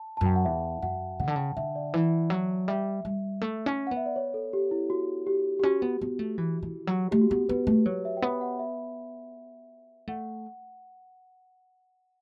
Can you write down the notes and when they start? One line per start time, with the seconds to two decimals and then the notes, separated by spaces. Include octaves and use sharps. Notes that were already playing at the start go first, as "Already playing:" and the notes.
Already playing: A5
0.17 F#2 A5
0.26 G5
0.36 F#5
0.45 E2 E5
0.82 F#2 F#5
1.20 C#3 F#5
1.27 D3 A5
1.36 C#3 G5
1.57 D3 E5
1.75 D5
1.94 E3 E5
2.30 F#3
2.68 G3 E5
3.05 G3
3.41 A3
3.66 C#4
3.87 B3 F#5
3.97 E5
4.06 D5
4.16 C#5
4.34 A4
4.53 G4
4.71 E4
4.90 F#4
5.27 G4
5.60 G4
5.63 C#4 F#4
5.82 B3
6.01 B3
6.19 A3
6.38 E3
6.63 E3
6.87 F#3
7.11 A3 G4
7.21 F#4
7.30 B3 G4
7.49 B3 B4
7.67 A3
7.86 F#3 C#5
8.05 E5
8.17 G5
8.22 B3 F#5
8.41 F#5
8.59 E5
10.07 A3 F#5